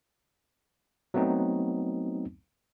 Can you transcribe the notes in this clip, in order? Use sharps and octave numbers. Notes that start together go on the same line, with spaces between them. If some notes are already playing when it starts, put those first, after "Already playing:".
F#3 A3 B3 C4 D#4